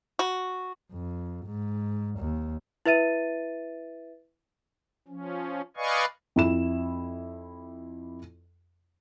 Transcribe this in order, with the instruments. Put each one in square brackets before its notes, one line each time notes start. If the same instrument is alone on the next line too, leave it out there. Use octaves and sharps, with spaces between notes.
[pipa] F#4
[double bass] F2
G#2
D#2
[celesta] E4 B4 E5 A6 D#7
[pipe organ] F3 C#4
B4 D5 D#5 F5 G#5 C#6
[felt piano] F2 E4 E7